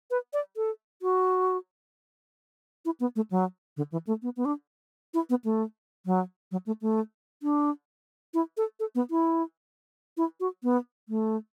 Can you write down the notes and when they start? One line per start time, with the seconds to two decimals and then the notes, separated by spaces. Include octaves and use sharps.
0.11 B4
0.33 D5
0.57 A4
1.02 F#4
2.85 E4
3.00 B3
3.16 A3
3.31 F#3
3.77 D3
3.92 E3
4.07 A3
4.22 B3
4.37 B3
4.45 D4
5.14 E4
5.30 B3
5.44 A3
6.06 F#3
6.52 F#3
6.66 A3
6.82 A3
7.43 D4
8.34 E4
8.57 A4
8.80 A4
8.95 B3
9.10 E4
10.17 E4
10.40 F#4
10.63 B3
11.09 A3